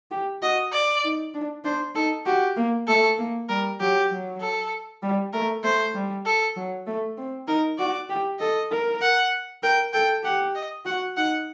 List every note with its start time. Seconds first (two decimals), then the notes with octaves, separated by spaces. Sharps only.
0.11 G4
0.42 F#4 D#5
0.72 D5
1.04 D#4
1.34 D4
1.64 D4 C5
1.95 D#4 A4
2.26 F#4 G4
2.57 A#3
2.88 A3 A4
3.18 A#3
3.49 G3 A#4
3.80 F#3 G4
4.11 F#3
4.41 A4
5.03 G3
5.33 A3 A#4
5.64 A3 C5
5.94 G3
6.25 A4
6.56 F#3
6.87 A3
7.17 C4
7.48 D#4 A#4
7.79 F#4 D5
8.10 G4
8.40 A4 D#5
8.71 A#4
9.02 F#5
9.63 A#4 G5
9.93 A4 G5
10.24 G4 F#5
10.55 D#5
10.85 F#4 F#5
11.17 D#4 F#5